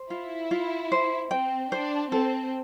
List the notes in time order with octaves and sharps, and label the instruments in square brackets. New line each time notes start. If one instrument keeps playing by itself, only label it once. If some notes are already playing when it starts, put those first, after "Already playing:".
Already playing: [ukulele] C5
[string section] E4 [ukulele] F4
[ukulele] F4
C5
[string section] C4 [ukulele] G5
[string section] D4 [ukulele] C5
[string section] C4 [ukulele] A4